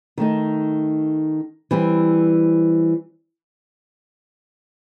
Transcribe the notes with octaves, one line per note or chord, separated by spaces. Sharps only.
D#3 A3 D#4
E3 G3 C4